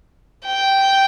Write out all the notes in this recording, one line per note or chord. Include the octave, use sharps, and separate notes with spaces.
G5